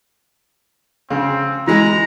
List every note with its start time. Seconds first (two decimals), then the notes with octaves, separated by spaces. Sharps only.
1.10 C#3 C4
1.67 E3 G#3 A#5